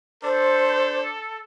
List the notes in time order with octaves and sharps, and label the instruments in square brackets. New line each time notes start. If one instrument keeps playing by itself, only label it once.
[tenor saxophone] D4 [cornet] A4 [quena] C5